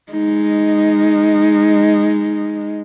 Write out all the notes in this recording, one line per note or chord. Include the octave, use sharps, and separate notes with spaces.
G#3 D#4